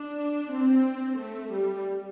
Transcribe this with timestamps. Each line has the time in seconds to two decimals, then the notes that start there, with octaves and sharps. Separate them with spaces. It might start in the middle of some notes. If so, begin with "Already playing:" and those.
Already playing: D4
0.52 C4
1.17 A3
1.51 G3